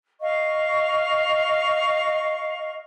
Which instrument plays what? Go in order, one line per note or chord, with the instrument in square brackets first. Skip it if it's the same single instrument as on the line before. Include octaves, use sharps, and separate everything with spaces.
[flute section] D#5 F5 C#6